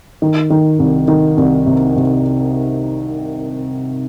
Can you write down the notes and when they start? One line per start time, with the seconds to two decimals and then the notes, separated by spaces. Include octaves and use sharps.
0.22 D#3
0.50 D#3
0.79 C2
1.08 D#3
1.37 C2
1.66 C3
1.96 C3